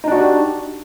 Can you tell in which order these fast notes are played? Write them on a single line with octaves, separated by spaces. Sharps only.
D#4 D4 F#4 D5 G4